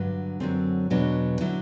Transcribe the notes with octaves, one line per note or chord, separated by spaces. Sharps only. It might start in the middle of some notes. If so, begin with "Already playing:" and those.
Already playing: G2 D3 F#3
F#2 D3 F#3 C4
E2 B2 F#3 D4
D3 F#3 E4